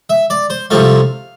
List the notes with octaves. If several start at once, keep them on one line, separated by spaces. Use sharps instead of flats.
E5
D5
C5
C2 C3 F3 A3 F5